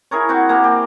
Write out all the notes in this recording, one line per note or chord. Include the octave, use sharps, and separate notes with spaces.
E4 G#4 A#4 C#5
C4 F#4
A#3 G4 G#4
G4